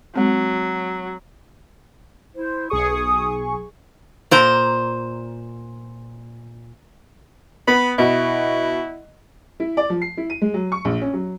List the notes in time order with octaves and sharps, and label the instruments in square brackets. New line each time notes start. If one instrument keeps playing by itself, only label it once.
[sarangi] F#3 [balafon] G#3 C4
[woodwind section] E4 C5
[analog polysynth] B1 G#4 C#6 [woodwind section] D#6
[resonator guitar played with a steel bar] A#2 C5 A#5
[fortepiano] B3 [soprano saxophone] B5
[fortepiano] B2 [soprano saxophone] E4
[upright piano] E4
D5
F3
C7
E4
D#7
G#3
F#3
C#6
A#1
C#4
F#3